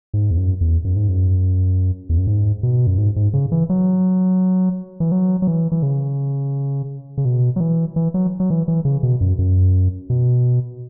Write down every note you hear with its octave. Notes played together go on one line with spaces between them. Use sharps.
G#2
E2
F#2
E2
F#2
G#2
F#2
E2
F#2
G#2
B2
F#2
G#2
G#2
C#3
E3
F#3
E3
F#3
F#3
E3
E3
C#3
C#3
B2
F#3
E3
E3
F#3
F#3
E3
E3
C#3
B2
F#2
F#2
B2